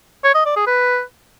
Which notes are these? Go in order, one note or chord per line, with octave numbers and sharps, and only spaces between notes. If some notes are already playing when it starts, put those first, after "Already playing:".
C#5
D#5
D5
G#4
B4